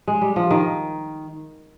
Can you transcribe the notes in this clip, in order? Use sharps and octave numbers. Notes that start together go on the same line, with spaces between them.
G#3
G3
F3
D#3